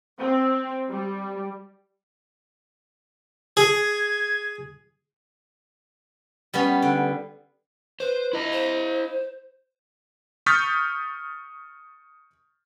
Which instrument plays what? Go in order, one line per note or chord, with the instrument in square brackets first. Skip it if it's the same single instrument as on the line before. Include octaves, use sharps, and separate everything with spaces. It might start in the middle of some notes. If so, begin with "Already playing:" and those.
[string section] C4
G3
[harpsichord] G#4 [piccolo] G#6
[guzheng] G3 B3 C#4
D3
[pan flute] B4 [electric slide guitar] C5
[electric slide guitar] E4 D#5
[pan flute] C5
[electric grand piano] C#6 D#6 F6 G6 A6 B6